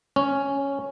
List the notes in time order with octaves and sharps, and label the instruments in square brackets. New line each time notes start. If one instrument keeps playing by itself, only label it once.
[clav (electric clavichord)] C#4